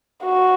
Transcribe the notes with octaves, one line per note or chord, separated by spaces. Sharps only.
F#4